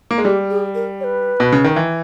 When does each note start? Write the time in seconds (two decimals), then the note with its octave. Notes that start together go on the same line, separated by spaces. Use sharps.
0.11 A#3
0.18 G#3
0.25 G3 G4
0.50 G#4
0.75 A#4
1.00 C#5
1.04 B4
1.40 B2
1.52 C#3
1.64 D#3
1.76 E3